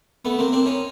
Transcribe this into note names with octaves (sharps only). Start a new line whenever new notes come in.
A3 B3
A#3 C4
C4 D4
C#4 D#4